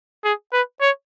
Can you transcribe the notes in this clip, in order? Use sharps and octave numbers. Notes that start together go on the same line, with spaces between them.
G#4
B4
C#5